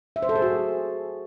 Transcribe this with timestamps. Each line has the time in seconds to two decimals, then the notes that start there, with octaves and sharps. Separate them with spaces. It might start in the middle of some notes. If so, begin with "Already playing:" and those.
0.16 E5
0.23 C5
0.29 A4
0.36 G#4
0.42 F#4